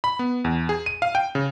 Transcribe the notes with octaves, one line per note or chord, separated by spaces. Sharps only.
B5
B3
E2
G#4
D#7
F5
G5
C#3